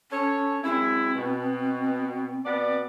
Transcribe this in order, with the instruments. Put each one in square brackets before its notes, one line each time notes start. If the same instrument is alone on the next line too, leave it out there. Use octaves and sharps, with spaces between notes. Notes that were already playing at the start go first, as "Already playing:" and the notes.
[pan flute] C#4 [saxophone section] A4 C#5
[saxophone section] F#2 G#3 E4 [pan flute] C4
[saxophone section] B2
B2 B3 D5